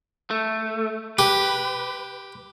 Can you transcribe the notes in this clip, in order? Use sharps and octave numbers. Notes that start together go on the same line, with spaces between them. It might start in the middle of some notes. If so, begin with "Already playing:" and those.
A3
G4 B4